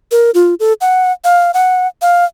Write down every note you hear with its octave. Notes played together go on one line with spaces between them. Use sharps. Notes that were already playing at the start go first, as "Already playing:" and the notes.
A#4
F4
A4
F#5
F5
F#5
F5